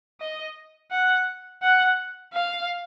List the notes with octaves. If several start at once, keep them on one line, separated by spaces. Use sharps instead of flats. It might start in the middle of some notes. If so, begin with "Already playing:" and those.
D#5
F#5
F#5
F5